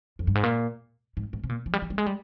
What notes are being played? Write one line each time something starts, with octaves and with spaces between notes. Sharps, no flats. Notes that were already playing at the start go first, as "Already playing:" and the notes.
F2
G2
G#2
A#2
G#2
G#2
C3
A#2
F3
G3
F3
G3
G#3
G3